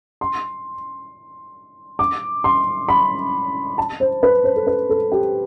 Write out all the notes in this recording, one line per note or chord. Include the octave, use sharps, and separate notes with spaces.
C6
D6
C6
B5
A5
C5
B4
C5
A4
B4
A4
G4